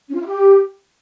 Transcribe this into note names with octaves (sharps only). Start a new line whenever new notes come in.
C#4
F4
E4
G4